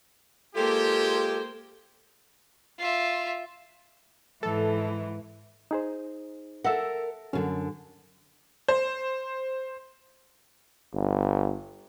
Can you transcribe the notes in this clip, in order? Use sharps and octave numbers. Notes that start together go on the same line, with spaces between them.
G#3 A#3 F4 G4 A4 C5
F4 E5
G#2 E3 A4
D#4 G#4 C5
A4 A#4 E5 F#5
F#2 D3 C#4
C5
G1